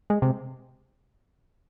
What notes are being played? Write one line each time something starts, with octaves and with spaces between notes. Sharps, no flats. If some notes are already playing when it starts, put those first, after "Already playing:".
G#3
C3